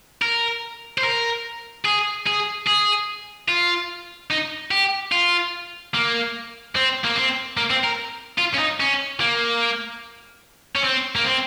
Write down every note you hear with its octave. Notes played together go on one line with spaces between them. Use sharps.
A#4
C5
A#4
G#4
G#4
G#4
F4
D#4
G4
F4
A#3
C4
A#3
C4
A#3
C4
A#4
F4
C#4
D#4
C#4
A#3
C#4
C4
A#3
C4